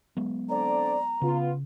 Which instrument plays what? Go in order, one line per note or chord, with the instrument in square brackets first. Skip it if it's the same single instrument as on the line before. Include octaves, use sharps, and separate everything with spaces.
[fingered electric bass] F#3 G#3 B3
[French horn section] D3 C4 D5 [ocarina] A#5
[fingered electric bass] C#3 [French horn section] B3 F4